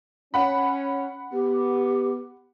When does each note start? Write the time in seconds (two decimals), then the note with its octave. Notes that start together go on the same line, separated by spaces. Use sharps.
0.34 C#4 F#5 B5
1.32 B3 G4